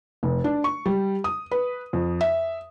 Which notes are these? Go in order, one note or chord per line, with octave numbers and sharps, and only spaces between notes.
F1
D4
C#6
G3
D#6
B4
F2
E5